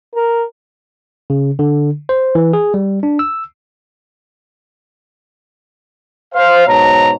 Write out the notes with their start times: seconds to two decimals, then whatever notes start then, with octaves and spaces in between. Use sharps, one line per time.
0.15 A#4
1.30 C#3
1.59 D3
2.09 C5
2.35 E3
2.53 G#4
2.74 G3
3.03 D4
3.19 E6
6.34 C5 F5
6.67 G#2 B2 C#5 A5 A#5